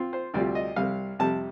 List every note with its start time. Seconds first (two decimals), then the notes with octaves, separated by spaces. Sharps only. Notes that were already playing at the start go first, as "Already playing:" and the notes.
Already playing: C4 F4
0.13 C5
0.34 D2 C3 G3 C4 F4 D5
0.55 D#5
0.76 C2 C3 G3 F5
1.19 F2 C3 G3 A5